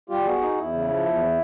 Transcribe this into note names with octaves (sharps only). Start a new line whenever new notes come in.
G3 F4 G4
B3 F#4 G#4
D#4
E2 E4
C#3
F3
E2